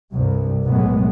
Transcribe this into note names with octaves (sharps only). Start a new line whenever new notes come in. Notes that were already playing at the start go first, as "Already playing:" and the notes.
C2 G2 C3
B1 F#2 A2 G#3 B3